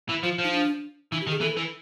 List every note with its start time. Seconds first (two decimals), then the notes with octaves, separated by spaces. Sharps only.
0.09 E3
0.23 F3 F4
0.39 F3
0.44 D#4
0.53 D4
1.12 E3 D#4
1.21 G4
1.27 D#3
1.31 G#4
1.41 E3 A4
1.57 E3